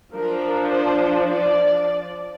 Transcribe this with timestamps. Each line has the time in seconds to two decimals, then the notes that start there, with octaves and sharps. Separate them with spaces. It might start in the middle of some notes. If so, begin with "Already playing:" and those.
0.15 F3 D4 A#4
0.67 C5
1.21 D5